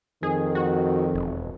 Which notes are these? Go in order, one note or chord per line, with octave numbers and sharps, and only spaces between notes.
F2 D#3 G#4
F#4
E1